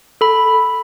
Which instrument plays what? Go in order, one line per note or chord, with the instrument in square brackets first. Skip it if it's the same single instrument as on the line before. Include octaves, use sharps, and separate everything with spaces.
[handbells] A4 B5